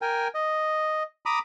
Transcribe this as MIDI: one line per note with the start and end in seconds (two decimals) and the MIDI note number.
0.02 0.28 70
0.02 0.28 79
0.02 0.28 80
0.35 1.03 75
1.26 1.39 82
1.26 1.39 83
1.26 1.39 86
1.26 1.39 87